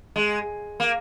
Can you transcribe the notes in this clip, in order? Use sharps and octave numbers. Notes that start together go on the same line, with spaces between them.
G#3
A#3